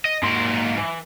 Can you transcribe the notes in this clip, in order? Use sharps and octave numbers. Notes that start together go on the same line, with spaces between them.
D#5
G#2 F#3 A#3 C6
E3